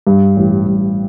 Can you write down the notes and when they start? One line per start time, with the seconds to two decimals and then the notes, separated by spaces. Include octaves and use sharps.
0.07 G2
0.37 A1
0.67 G2